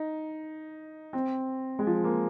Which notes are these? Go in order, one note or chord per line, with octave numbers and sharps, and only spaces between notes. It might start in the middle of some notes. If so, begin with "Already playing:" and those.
Already playing: D#4
C4
G#3
F3
A#3